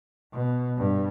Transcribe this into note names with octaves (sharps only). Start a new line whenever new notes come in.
B2
G2